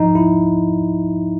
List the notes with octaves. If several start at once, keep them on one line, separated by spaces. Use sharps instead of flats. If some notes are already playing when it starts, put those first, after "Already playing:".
Already playing: G#2 F3 D#4
E4